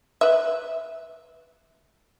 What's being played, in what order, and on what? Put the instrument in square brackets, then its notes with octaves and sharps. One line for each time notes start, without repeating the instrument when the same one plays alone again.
[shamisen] B4 E5